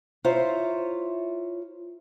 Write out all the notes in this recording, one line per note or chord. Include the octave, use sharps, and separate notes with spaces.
E4 F4 C5 C#5 E5 A#5